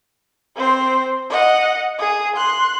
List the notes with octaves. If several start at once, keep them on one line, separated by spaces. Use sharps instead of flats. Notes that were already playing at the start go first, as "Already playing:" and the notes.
C4 C5
D#5 F#5
G#4 D#6
C6 F#6